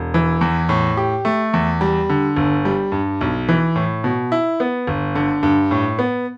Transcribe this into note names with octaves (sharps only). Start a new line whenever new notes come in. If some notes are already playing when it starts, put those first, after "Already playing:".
Already playing: E1
E3
E2
A2
G4
A3
E2
G3
D3
G1
G3
G2
B1
E3
A2
B2
E4
B3
G1
D3
G2
A2
B3